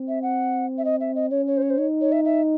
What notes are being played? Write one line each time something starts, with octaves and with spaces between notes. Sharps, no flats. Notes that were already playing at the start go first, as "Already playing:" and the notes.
Already playing: C4
E5
F#5
E5
D#5
E5
D#5
C#4 C#5
C#5
C5
C#5
C5
D#4 C#5
C#5
E5
E5